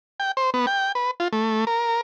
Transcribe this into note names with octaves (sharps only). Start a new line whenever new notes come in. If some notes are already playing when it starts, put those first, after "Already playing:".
G5
C5
B3
G5
B4
F4
A3
A#4